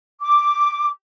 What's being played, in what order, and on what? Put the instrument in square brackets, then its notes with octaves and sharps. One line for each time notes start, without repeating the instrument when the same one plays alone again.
[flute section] D6